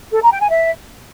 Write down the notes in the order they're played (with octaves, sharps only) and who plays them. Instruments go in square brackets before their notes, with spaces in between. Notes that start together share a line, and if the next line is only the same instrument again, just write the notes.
[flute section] A4
A#5
G5
G#5
E5